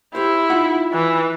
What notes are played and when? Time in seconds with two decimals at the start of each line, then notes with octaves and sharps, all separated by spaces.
0.15 E4 G4 C5
0.50 D#4 F4 F#5
0.93 E3